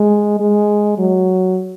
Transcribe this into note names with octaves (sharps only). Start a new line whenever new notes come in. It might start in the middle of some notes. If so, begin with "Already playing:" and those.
Already playing: G#3
G#3
F#3